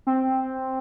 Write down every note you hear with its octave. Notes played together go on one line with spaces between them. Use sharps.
C4